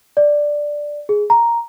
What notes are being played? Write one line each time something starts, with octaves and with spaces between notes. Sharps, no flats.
D5
G#4
A#5